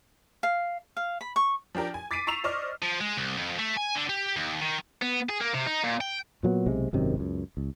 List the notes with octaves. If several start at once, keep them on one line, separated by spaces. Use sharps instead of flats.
F5
F5
B5
C#6
F3 D4 G4 A#4 A5
G#5
D6 A6 B6 C7 D7 D#7
A#5 C#6 E6 C7 E7 F7
C5 D5 D#5 C#6 D6 F6
F3
G#3
C2
F2
A3
G#5
D3
G4
D#2
D#3
B3
G#4
A#3
C3
D#4
A#2
G5
A#2 F#3 A#3 B3
B1 C3 G#3
G#1 F#2 C3 D#3
C#2 F#2
C#2